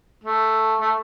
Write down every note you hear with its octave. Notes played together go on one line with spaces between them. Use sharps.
A3
A3